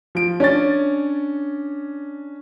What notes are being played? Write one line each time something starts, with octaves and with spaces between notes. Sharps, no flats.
F3 D7
C#4 D4 C#5 A6